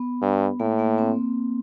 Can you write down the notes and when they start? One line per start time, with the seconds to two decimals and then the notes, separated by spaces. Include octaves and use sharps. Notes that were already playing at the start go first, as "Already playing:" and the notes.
Already playing: B3
0.21 G2
0.60 A2 A#3
0.79 A#3
0.98 C4